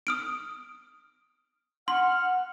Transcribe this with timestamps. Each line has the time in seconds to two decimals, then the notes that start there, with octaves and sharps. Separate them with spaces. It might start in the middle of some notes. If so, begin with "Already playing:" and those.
0.07 D#6 F6 D7
1.88 F#5 C6 F6